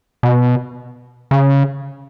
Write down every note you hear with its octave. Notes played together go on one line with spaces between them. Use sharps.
B2
C#3